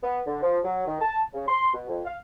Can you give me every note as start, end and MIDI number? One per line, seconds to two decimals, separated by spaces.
0.03 0.20 59
0.26 0.41 50
0.42 0.58 53
0.64 0.86 54
0.87 1.00 51
1.00 1.22 81
1.34 1.43 49
1.48 1.73 84
1.74 1.86 47
1.89 2.01 41
2.05 2.17 77